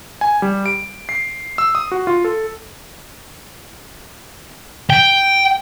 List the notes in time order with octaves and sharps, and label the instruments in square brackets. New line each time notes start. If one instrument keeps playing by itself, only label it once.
[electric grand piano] G#5
G3
D7
C7
E6
D#6
F#4
F4
A4
[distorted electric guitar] G5